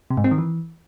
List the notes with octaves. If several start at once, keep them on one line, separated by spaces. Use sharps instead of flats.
C3
G#2
C4
D#3
E3